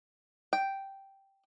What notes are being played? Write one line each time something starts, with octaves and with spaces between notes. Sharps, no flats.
G5